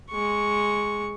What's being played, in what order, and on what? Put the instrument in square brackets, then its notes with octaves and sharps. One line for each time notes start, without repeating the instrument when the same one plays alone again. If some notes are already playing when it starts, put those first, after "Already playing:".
[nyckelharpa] G#3 C#6